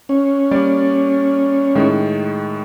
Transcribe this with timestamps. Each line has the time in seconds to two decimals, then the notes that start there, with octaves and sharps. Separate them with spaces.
0.09 C#4
0.51 G3 A#3 D5
1.75 A2 D#3 G#3